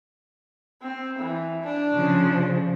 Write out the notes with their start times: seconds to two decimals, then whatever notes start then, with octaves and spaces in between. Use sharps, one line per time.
0.82 C4
1.19 E3
1.63 D4
1.94 C#3 F3